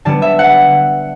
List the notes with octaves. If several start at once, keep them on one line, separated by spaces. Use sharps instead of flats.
D3 G3 B3 A5
E5
F#5